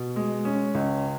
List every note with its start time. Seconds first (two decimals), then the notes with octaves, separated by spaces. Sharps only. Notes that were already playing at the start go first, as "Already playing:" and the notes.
Already playing: B2
0.16 G#3
0.45 C#4
0.74 C#2